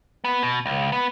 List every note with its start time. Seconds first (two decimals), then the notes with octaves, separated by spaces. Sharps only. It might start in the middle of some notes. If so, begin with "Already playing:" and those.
0.24 B3
0.43 B2
0.66 C#2
0.92 B3